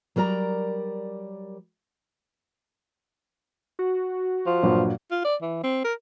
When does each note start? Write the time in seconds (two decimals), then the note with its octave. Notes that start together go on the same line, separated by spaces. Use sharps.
0.16 F#3 G3 A#4 D5 A#5
3.79 F#4
4.46 F3
4.63 G2 A#2 F#3
5.11 F4
5.25 D5
5.42 E3
5.64 C4
5.85 A#4